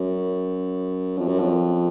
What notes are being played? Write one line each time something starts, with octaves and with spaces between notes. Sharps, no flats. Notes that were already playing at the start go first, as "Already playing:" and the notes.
Already playing: F#2
F2
F#2
F2